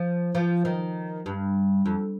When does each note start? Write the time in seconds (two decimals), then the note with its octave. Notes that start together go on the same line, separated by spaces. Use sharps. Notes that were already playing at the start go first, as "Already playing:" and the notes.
Already playing: F3
0.35 F3
0.65 D#3
1.26 G2
1.86 F2